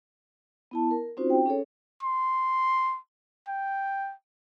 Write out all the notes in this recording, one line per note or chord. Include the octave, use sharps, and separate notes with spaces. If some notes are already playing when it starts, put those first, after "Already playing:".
B3 E4 A5
A#4
C4 C#4 D#4 F4 F#4 C5
G5
C#4 G#4 A4 C#5
C6
G5